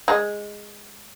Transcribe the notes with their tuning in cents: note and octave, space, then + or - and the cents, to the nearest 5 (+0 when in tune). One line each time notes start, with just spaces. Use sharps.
G#3 -5